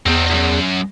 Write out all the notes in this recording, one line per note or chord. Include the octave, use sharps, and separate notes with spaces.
E2 C4 D#4
C#2 F#2